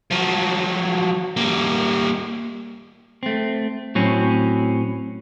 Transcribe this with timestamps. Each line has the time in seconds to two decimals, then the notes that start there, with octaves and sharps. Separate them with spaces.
0.11 F3 F#3
1.37 G3 A#3
3.23 A3 C4
3.95 A2 F#3 C4 C#4